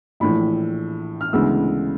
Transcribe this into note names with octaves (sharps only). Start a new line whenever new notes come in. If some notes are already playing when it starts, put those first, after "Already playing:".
A#1 A2 E3 B5
F6
D2 C#3 E3 G#3 B3 E6